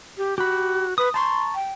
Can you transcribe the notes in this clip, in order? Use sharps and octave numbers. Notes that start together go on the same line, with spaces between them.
G4
F#4 G4 B5
B4 D#6
A5 A#5 C6 C#6
G5